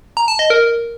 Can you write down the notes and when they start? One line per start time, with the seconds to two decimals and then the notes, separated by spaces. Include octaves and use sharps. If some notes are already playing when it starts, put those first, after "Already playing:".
0.17 A#5
0.28 A5
0.39 D#5
0.50 A#4